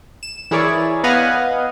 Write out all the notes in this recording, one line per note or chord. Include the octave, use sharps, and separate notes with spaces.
E7
E3 E4 G#4 A#4 C#5 D5
B3 B4 D#5 F5 F#5 G#5